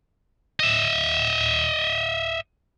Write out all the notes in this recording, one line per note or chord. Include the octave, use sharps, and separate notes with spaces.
D#5 E5